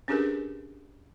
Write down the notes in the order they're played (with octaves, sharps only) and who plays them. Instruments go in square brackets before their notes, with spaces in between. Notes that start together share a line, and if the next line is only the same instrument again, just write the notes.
[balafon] C#4 D4 G4 G#4 A#4 B4